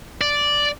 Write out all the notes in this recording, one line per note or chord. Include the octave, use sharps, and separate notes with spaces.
D5